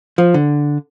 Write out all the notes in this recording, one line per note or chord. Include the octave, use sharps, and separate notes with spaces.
F3
D3